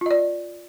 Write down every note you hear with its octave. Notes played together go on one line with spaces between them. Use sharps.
F4 D5 D#5